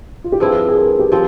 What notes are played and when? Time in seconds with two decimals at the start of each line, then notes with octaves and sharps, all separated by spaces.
0.24 F4
0.32 G4
0.39 G2 F3 C4 E4 G#4
0.68 G#4
0.76 A#4
0.99 G4
1.12 F3 C4 G4